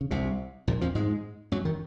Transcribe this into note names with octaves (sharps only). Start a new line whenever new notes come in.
C#3
C2 C3
A#1 A#2
F2 F3
G#2 G#3
F#2 F#3
D#3